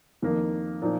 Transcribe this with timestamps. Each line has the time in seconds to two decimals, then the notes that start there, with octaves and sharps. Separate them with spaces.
0.22 F2 D#3 A#3
0.82 A#2 F3 D#4